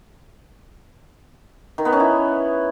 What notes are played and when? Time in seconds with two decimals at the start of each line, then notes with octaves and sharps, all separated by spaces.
1.78 D#3
1.85 B3
1.93 C#4
2.00 E4